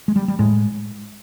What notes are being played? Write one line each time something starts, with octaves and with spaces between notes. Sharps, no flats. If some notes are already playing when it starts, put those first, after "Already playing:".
G#3
G3
G3
A2 G#3